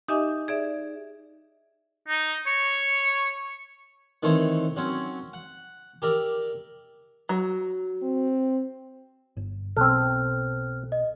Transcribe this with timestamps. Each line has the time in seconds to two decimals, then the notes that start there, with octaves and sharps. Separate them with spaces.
0.08 D#4 G4 D#5 E5 G#5 D6
0.48 G#4 D5 E5
2.08 D#4
2.46 C#5
4.23 D#3 E3 A3 C4 C5 C#5
4.76 F#3 C4 C#4
5.33 F#5
6.02 G4 A#4 D5 E5
7.29 F#3
8.03 C4
9.37 G1
9.77 B1 B2 C4 A4 F6 F#6
10.92 D#5